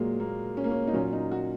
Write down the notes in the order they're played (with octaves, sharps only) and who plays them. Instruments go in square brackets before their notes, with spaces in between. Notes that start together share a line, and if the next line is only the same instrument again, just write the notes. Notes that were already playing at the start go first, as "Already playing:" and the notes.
Already playing: [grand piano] A#2 F#3 G#3 A#3
A#3
C#4
A#3
C#4
D#4
A#2 F#3 C#4
D#4
F#4